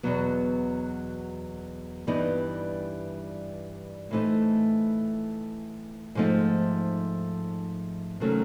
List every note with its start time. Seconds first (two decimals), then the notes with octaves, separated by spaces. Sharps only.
0.03 E2 B2 F#3 B3
2.07 G2 E3 G3 B3 D#4
4.11 A2 E3 A3 C4 D#4
6.15 G#2 F3 A3 C4 D#4
8.20 C3 D#3 F#3 A3 C#4